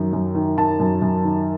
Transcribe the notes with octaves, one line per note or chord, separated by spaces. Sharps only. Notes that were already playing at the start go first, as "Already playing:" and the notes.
Already playing: F#2 D#3
F#2
D#3
D#3 A5
F#2
F#2
D#3